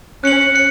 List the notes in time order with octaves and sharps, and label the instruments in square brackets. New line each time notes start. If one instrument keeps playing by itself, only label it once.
[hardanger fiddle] C#4 [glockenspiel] F#6 C#7 F#7
[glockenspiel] F#6 C#7